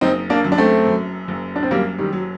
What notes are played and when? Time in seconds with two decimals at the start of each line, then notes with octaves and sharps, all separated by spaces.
0.01 F#1 C4 D#4
0.30 A#3 D4
0.44 F#2
0.52 D4
0.58 A3 C4
0.86 F#2
1.28 F#1
1.56 D4
1.63 C4
1.71 F#2 G3 A#3
1.98 D#3 G3
2.13 F#3